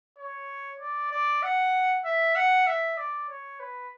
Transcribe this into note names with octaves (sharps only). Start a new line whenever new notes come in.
C#5
D5
D5
F#5
E5
F#5
E5
D5
C#5
B4